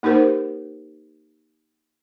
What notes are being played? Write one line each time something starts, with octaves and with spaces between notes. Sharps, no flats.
A#3 D#4 G4 A#4 C5